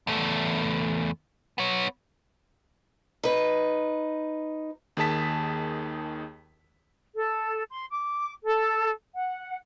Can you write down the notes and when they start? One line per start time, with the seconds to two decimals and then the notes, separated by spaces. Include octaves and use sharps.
0.07 E2 A3
1.58 B3 C#5
3.23 D#4 B4
4.97 D#2 D#3 G#4 A5 B6
7.14 A4
7.70 C6
7.91 D6
8.46 A4
9.14 F#5